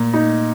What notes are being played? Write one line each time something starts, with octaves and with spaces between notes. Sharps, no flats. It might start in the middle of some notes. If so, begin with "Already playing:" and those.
Already playing: A#2
D#4